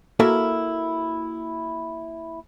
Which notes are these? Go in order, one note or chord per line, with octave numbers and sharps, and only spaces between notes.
A#3 E4 F#4 A4 A#4 E5